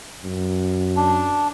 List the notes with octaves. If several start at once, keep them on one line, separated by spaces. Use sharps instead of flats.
F#2
D4